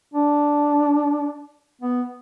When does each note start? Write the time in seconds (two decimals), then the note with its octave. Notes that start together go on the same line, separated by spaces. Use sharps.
0.14 D4
1.81 B3